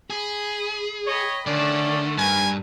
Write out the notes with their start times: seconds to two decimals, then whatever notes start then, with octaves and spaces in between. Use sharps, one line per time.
0.10 G#4 B5 D#6
1.06 C#5 D#5 G5 B5
1.47 D3 D#3 A3 C#4 D5
2.18 G2 A#4 B4 G#5